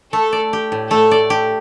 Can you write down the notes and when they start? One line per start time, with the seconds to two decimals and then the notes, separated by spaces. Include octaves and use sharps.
0.13 A3 A4
0.32 D5
0.53 G4
0.72 A2
0.91 A3 A4
1.11 D5
1.30 G4